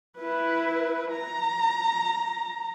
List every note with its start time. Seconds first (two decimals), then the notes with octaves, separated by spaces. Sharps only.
0.18 E4 B4
1.11 A#5